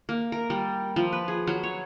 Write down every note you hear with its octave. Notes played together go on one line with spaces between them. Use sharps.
A#3
A#4
G3
F3
B4
G#4
F#3
C#5